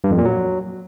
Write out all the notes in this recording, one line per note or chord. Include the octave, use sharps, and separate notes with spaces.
G2
F2
A#2
F#3